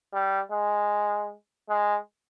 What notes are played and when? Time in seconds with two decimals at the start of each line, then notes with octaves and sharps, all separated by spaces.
0.13 G3
0.51 G#3
1.69 G#3